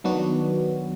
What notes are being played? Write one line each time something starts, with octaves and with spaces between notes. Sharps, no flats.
D#3 F#3 B3 D4 F#4